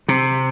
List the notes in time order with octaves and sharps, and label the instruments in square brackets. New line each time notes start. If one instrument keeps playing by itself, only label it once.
[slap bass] C3